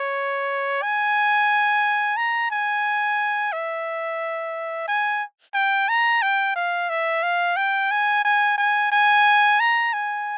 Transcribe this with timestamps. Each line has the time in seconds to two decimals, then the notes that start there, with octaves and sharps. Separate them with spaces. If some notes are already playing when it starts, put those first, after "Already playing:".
Already playing: C#5
0.82 G#5
2.17 A#5
2.51 G#5
3.52 E5
4.88 G#5
5.54 G5
5.89 A#5
6.22 G5
6.56 F5
6.89 E5
7.23 F5
7.57 G5
7.91 G#5
8.25 G#5
8.58 G#5
8.92 G#5
9.60 A#5
9.93 G#5